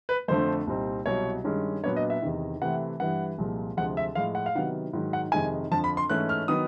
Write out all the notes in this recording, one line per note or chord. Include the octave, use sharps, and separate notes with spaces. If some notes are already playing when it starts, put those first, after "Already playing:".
B4
F2 D3 F3 A3 C5
C2 A#2 G3 C4 D#4
C2 B2 F#3 C#5
G2 D#3 G#3 C#4
A#2 F#3 B3 D4 C#5
D#5
E5
E2 C3 D#3
C3 E3 A3 C4 F#5
G2 E3 G3 F#5
C2 A#2 F3 G#3
D2 C3 F3 G#3 F#5
E5
A2 F3 G#3 F5
F#5
F5
C3 D#3 F#3 B3 F#5
G#2 D#3 F#3
F#5
F2 C3 D#3 G#3 G#5
F2 D3 F3 A5
B5
C6
G#2 E3 A3 C#4 F#6
F6
D#3 F#3 B3 D#6